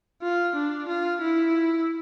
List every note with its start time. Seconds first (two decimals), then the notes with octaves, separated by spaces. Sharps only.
0.22 F4
0.55 D4
0.88 F4
1.21 E4